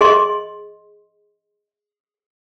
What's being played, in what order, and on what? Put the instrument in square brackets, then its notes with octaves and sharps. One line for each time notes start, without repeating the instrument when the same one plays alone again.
[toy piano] G#4 D#5 C6